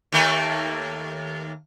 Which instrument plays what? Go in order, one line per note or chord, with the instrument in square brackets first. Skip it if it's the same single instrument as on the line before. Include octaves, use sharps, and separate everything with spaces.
[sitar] D#2 A3 A#3